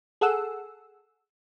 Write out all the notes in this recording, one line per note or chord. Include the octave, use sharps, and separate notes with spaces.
G#4 A4 F#5 E6